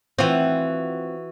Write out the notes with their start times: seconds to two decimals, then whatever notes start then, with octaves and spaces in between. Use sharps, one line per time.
0.18 E3 C4 F4 F#4